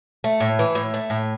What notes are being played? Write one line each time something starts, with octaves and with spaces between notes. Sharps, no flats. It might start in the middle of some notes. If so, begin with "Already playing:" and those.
A3
A2
E3
A2
A3
A2